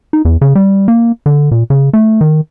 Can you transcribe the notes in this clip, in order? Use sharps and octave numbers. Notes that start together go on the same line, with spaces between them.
D#4
E2
C#3
G3
A#3
D3
A#2
C#3
A3
D#3